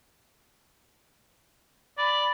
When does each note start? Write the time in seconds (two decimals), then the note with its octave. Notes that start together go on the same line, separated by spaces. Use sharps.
1.98 D5 B5